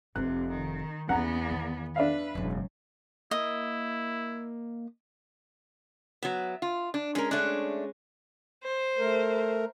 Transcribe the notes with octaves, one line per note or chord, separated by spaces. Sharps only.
F1 C3 F4 F#6
D#3
E2 A#3 B3 C#4 F#5 A#5
D#3
D4 B4 E5 F5
E1 F#2 C#3
A#3 E4 D#5
F#3 B3 E5
F4
D4
G#3 C#4 A#4
A3 C#4 D4 F#5
C5
A3 A#4